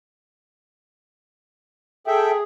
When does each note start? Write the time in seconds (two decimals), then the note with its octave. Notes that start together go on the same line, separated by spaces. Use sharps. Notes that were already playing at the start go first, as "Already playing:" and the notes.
2.07 G#4 A4 E5 G5